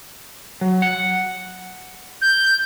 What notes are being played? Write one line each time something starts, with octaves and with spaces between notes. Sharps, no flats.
F#3
F#5
G6